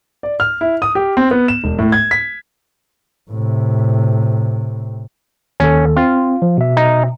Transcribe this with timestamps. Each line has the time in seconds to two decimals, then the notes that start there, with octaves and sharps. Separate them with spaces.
0.23 D5
0.40 F6
0.61 E4
0.82 D#6
0.95 G4
1.17 C4
1.31 B3
1.48 E7
1.64 E1
1.79 A2
1.92 G#6
2.11 B6
3.30 A2 C3
5.60 D#2 D#3 C#4 A4
5.96 C4 F4
6.42 F3
6.58 B2 E5
6.77 D#4